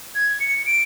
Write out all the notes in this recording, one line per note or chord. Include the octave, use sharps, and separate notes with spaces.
G#6
C#7
D7